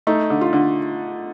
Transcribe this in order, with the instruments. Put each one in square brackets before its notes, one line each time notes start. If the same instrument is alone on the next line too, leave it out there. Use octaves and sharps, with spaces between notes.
[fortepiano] A3 [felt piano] D#4
[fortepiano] D3
[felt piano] F4
[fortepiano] D3